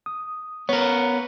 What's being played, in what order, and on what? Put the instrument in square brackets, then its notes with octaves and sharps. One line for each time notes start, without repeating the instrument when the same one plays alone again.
[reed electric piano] D#6
[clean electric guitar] B3 A#4 [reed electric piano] C#5